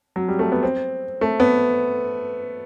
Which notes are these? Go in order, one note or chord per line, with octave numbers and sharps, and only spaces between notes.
F#3
G3
A3
B3
C4
A3
B3